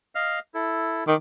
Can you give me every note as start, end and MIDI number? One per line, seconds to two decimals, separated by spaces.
0.15 0.39 75
0.15 0.39 77
0.15 0.39 89
0.54 1.04 64
0.54 1.04 69
1.07 1.15 51
1.07 1.16 86